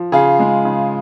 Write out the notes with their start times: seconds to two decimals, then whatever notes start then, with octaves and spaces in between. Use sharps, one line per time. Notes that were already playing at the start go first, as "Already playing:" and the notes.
Already playing: F3
0.12 C#3 F4 G#4
0.39 G#3
0.65 C#3